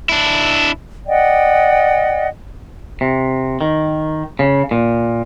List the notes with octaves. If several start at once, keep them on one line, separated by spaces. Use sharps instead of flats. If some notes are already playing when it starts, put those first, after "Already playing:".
D4 E4
D5 D#5 F#5 G5
C3
D#3
C#3
A#2